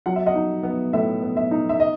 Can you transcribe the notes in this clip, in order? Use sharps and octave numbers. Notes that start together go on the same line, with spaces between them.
F#3 F#5
E5
D#5 F#5
D#4
B3
A2 E5
B3
E5
D#4
E5
D#5